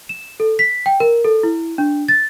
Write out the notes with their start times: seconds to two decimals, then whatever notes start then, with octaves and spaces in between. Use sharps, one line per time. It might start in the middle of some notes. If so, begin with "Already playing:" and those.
0.09 E7
0.40 A4
0.59 B6
0.86 G5
1.00 A#4
1.24 A4
1.43 E4
1.78 D4
2.08 A6